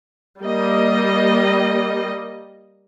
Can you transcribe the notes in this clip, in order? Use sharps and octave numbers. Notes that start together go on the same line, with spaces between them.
G3 A#3 G4 D#5